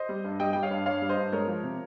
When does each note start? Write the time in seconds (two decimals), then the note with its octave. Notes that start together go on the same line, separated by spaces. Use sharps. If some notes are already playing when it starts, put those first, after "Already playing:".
Already playing: C5 D#5
0.09 G3
0.24 G2
0.39 G3 D#5 G5
0.53 G3 G5
0.63 C#5 F5
0.71 G2
0.86 G2 C#5 F5
1.02 G3
1.09 C5 D#5
1.17 G2
1.32 G#3 A#4 C#5
1.48 F3
1.63 C3